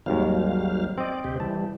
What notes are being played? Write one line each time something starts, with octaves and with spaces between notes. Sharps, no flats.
G#1 D#2 F#3 G3 F5
C4 D5 D#5
D2 C3 G4
E3 G3 A5